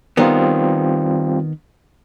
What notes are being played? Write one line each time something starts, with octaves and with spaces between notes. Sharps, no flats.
D#3 G3 B3 C4 F4